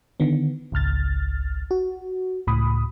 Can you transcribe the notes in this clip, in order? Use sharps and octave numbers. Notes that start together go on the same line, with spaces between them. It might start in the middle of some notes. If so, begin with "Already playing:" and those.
D3 D#3 B3
G#1 C#2 F6 A6
F#4
C#2 A2 B5 D#6